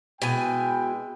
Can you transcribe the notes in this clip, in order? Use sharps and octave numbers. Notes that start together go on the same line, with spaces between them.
B2 G#3 E4 G5 G#5